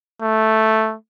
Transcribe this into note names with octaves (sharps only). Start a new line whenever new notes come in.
A3